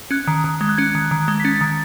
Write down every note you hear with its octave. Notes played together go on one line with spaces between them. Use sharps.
C#4 F#6
D#3
D#3
G#3
F#6
C#4 G#6
D#3
D#3
G#3
B6
C#4 A6
D#3